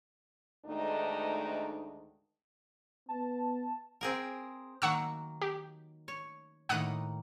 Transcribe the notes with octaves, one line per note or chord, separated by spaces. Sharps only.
D2 G#2 D#3 A3 D4 D#4
B3 A5
C4 G#4 A#4
D#3 F#3 A#3 F#5 C#6 E6
G4
C#5
A2 D#3 A#3 F#5 D#6 F#6